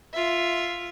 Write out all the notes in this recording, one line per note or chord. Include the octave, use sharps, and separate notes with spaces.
F4 E5